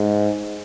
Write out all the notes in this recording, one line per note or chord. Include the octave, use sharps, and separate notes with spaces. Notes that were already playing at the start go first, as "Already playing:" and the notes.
Already playing: G#2